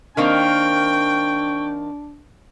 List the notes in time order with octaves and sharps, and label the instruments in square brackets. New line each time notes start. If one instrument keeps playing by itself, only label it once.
[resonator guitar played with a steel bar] D#3 A#3 C4 [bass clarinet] D4 [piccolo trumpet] G5 [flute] C#6